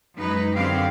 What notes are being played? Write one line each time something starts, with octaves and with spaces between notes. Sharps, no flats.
F#2 G#3 D#4 B4
F#2 D3 C4 G4 F5